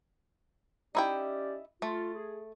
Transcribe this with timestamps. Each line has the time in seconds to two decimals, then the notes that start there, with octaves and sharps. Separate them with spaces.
0.95 C#4 D#4 E4 G4 D5 G5
1.82 A3 F4
2.15 G#4